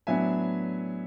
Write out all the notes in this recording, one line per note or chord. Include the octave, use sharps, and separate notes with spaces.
A2 F#3 B3 D4 E5 G#5